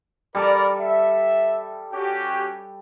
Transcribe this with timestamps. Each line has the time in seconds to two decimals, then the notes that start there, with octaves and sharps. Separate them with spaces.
0.35 G3 A4 A#4 D5
0.80 E5
1.93 C#4 F#4 G4